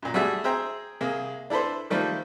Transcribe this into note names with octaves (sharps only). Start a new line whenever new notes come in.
F#2 A#2
G3 A3 F#4 G#4 E5 A5
G#4 C5 E5 G5 A#5
C2 A#3 G#4
D4 E4 A4 B4 C5
D#3 F3 G3 A3 A#3 C4